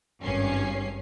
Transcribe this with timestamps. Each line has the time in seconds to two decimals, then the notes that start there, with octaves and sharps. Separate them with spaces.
0.22 G#1 G2 C#4 C7